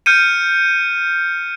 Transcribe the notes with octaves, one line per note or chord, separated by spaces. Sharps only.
F6 G6 C#7 D#7